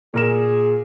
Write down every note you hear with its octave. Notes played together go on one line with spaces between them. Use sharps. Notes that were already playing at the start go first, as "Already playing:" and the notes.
A#2 G#4 A#4 E7